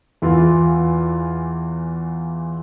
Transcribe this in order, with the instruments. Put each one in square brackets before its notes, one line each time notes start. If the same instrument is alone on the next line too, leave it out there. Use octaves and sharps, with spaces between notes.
[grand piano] E2 E3 F4 F5